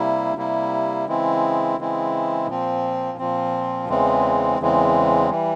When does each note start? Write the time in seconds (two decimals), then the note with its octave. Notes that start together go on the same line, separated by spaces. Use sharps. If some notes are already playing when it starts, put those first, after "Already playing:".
Already playing: C3 G3 A#3 E4
0.36 C3 G3 A#3 E4
1.07 C#3 E3 G#3 C4 E4
1.78 C#3 E3 G#3 C4 E4
2.48 A#2 F3 C4
3.18 A#2 F3 C4
3.88 E2 C#3 E3 G#3 C4
4.59 E2 C#3 E3 G#3 C4
5.30 E3 G3